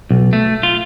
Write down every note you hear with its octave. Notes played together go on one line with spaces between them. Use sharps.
B1
A3
F4